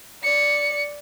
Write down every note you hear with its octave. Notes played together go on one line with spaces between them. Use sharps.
D5 C#7